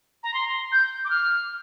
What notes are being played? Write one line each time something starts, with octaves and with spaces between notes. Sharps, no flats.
A#5
C6
G6
D6
F6